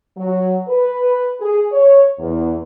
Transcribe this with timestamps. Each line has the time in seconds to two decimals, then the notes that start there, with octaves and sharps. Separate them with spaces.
0.17 F#3
0.68 B4
1.40 G#4
1.72 C#5
2.19 E2